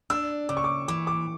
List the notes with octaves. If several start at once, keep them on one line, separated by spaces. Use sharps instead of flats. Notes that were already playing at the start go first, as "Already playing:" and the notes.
D4 E6
C#3 D6
C#6
D6
E3 D6
D6